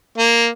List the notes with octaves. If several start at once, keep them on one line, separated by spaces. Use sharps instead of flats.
A#3